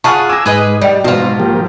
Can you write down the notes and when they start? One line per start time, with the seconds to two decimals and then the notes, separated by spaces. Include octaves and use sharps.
0.04 F4 G#4 F#5 A5 B5 C#6 F6
0.29 G#5 D6 E6 A#6
0.46 G#2 G#4 B4 D#5
0.81 G3 D5 D#5 G5
1.04 B1 G#2 B2 F4 C5
1.40 F3 A#3 G4